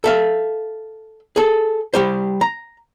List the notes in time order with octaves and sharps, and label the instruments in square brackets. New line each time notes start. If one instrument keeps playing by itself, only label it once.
[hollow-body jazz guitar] A4 E5 F5
G#4 A4
G3 G4 C5
A#5